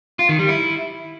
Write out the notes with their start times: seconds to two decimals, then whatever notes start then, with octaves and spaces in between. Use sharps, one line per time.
0.19 F4
0.29 D#3
0.39 G3
0.49 E4